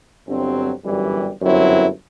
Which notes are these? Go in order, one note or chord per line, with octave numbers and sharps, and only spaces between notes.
G1 G2 F#3 C4
G1 F#2 E3 G3
G1 F#2 F#3 C4 E4